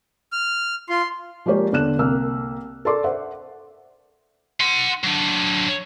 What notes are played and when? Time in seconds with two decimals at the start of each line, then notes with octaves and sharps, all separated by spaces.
0.32 F6
0.90 F4 C6
1.46 F3 G#3 A#3 G4 C#5 D5
1.72 E2 D3 D5 F#6 E7
1.99 C2 A#3 E6 F6
2.85 A4 A#4 D5 C6 D6
3.04 C5 E5 F#5
4.60 F#5 C6
5.03 F#3 D4